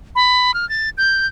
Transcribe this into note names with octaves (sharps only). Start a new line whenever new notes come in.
B5
F6
A6
G6